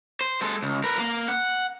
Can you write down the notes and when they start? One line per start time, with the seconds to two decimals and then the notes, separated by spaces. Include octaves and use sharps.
0.21 C5
0.41 G#3 A4
0.63 C#2
0.84 A#4 B4
0.98 A#3
1.28 F#5